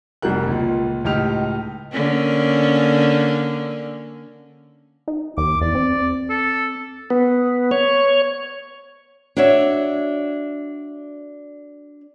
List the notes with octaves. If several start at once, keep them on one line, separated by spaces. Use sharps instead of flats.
F1 G3 F#4 A#4 F#6
C#2 A#2
C#2 A2 D#4 G4 F6 F7
D3 A#3 C#4
D#4
D#2 D6
E2 D5
C4
A4
B3
C#5
D4 F#4 C#5 E5